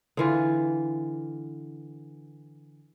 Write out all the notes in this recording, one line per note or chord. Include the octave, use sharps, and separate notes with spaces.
D3 E3 F4